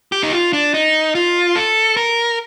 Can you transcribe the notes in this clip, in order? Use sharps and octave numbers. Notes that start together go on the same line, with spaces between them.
G4
D#4
F4
D4
D#4
F4
A4
A#4